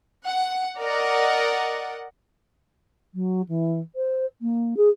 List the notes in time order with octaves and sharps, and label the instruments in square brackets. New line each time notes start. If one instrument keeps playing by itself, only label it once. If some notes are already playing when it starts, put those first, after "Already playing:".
[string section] F#5
A#4 D5 D#5 F#5
[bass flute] F#3
E3
C5
A#3
G#4